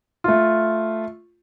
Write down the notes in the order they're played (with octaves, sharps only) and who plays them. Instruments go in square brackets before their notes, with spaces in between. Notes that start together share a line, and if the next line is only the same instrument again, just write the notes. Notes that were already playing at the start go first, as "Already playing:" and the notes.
[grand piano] A3 F4